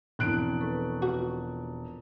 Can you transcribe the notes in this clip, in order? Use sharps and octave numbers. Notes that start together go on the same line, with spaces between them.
E1 F3 C4 E4 F#6 D7
A4 B4 C#6
F4 F#4 B4